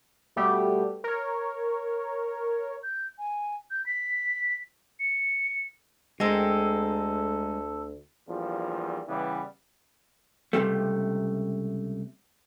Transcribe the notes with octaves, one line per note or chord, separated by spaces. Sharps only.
B2 G3 A3 B3 G4
A#4 C#5
G6
G#5
G6
B6
C#7
D2 G#3 C4 A4 A#4
A#1 E2 F3 G3
C#3 E3 G3 B3
C#2 C3 G3 A3